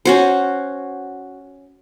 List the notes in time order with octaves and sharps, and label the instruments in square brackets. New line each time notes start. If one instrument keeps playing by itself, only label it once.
[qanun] C#4 F#4 C5